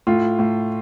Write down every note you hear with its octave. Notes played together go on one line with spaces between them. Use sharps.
A2 F4
A2